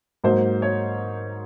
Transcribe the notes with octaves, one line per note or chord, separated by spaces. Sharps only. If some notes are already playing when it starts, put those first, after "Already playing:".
G#2 F#3 A#3 C5
C#5